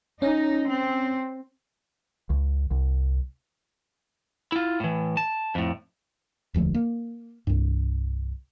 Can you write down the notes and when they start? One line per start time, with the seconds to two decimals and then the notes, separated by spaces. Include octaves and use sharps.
0.22 C#4 D#4
0.70 C4
2.30 C#2
2.71 C2
4.52 E4 F4
4.80 A2 E3
5.17 A5
5.55 F2 A2
6.54 E1 D2 F3 A3
6.74 A#3
7.47 C2 G2